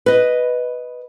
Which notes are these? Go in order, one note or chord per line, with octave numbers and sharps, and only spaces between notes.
B4 D#5